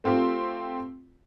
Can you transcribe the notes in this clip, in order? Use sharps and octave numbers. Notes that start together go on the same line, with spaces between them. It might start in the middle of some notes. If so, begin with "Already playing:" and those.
A3 C4 F4 G4